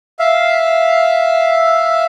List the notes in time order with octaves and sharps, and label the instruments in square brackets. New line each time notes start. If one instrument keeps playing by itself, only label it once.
[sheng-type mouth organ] E5 F5